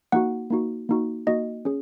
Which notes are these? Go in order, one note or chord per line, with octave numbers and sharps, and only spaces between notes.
A#3 D#4 F#4 F#5
A#3 D#4 F#4
A#3 D#4 F#4
A#3 D#4 F#4 D#5
C#4 G#4